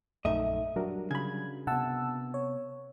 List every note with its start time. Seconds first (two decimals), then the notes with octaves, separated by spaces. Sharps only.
0.25 A#1 F#2 A3 D#4 D#5 E5
0.76 F#3 G3 D4 F#4 A#4
1.11 C#3 B5 G#6
1.67 C3 B3 F#5 A5 E6
2.34 C#5